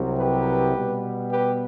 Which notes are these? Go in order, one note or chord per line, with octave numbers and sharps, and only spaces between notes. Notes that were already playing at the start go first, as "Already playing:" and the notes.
Already playing: C2 C3 F#3 C4
G4 B4
B2 G3 B3
G4 B4